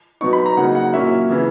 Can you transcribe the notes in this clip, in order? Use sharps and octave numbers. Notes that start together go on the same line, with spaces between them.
B2 F#3 B3 D#4 C#6
B5
A#5
C#3 F#3 A#3 D#4 F#5
F#5
A#2 F#3 A#3 C#4 E4 E5
C#3 E3